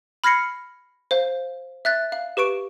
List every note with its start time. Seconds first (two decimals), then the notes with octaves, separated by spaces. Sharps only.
0.24 B5 F6 G#6 A#6 C7 C#7
1.11 C5 F5 G6
1.85 E5 F#6 A6
2.12 F5
2.37 G4 B4 C#6 D7